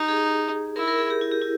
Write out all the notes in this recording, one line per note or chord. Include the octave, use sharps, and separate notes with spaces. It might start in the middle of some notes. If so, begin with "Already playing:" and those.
Already playing: D#4 G4
G#4
E4 A#4
A#4
G#4
G4
E4
G4
E4